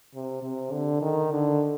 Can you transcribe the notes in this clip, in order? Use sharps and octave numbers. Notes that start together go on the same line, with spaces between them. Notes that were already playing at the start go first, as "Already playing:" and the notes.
C3
C3
D3
D#3
D3